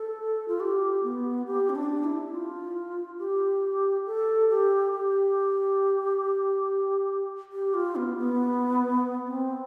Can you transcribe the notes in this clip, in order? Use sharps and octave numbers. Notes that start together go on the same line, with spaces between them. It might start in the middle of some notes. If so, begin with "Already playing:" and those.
Already playing: A4
F4
G4
B3
G4
C4
D4
E4
F4
G4
A4
G4
G4
G4
F4
B3
B3
C4